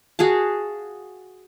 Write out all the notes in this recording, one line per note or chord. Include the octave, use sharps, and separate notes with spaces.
F#4 G#4 F5 A5